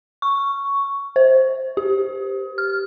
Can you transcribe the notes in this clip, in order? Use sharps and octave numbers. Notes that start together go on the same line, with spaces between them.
C#6
C5
G4
F6